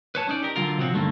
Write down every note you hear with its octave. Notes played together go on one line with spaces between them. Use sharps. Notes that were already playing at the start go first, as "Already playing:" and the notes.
B4 C#5 A5
C#4 D#4 D5
G4 A#4
D3 F#3 F4 A#4
C3 F3 F#3 C4 F#4
G2 D3 D#3 A3 A#3